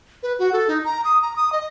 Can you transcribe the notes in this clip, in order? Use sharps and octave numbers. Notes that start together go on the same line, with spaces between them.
B4
F#4
A4
D#4
A#5
D#6
A#5
D#6
D#5